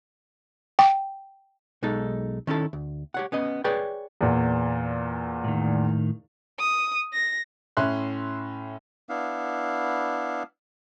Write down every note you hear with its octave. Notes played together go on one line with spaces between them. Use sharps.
G5
B1 G#3 D#4 A4
D#3 C#4 E4 A4
D2
G4 C#5 F#5
B3 C#4 D#5
G#4 B4 C#5 D5 G5
E2 A#2
A2 D#3
D#6
A#6
A2 C#4 E5 C6 F#6
B3 D4 E4 F5